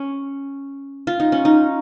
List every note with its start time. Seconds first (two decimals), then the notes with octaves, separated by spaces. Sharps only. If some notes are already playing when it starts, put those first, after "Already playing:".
Already playing: C#4
1.07 F4
1.20 D#4
1.32 C#4
1.45 D#4